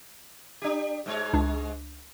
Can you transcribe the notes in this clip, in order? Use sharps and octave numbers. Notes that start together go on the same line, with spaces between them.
D4 G4
G#2 G#3 C#5
C#2 D4